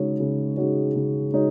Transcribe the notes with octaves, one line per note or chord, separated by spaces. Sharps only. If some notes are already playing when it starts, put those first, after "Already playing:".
Already playing: C#3 G#3 D#4 F#4 C#5
C#3
G#3 D#4 F#4 C#5
C#3
G#3 D#4 F#4 C#5